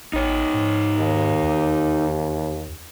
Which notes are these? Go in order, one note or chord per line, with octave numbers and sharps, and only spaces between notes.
A1 D#4 C#5
G#2
D#2
E2